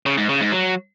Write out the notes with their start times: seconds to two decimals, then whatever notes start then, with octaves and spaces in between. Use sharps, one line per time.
0.06 C#3
0.17 G#2
0.29 C#3
0.40 G#2
0.52 F#3